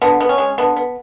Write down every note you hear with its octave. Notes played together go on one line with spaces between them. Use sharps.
D3 B3
B3
C#4
G#3
D3 B3
B3